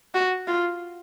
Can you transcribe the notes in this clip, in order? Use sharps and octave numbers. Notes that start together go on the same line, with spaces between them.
F#4
F4